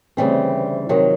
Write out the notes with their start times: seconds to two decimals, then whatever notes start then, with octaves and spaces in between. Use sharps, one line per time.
0.17 D2 C#3 E3 G3 C4
0.89 F2 C3 D#3 F#3